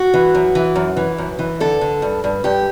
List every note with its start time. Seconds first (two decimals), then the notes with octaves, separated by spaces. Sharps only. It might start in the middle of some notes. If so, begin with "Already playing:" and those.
Already playing: F#4
0.14 E3
0.35 F#2
0.55 E3
0.76 F#2
0.97 E3
1.18 F#2
1.39 E3
1.60 D3 A4
1.81 D3
2.02 G2
2.24 G2
2.44 G2 G4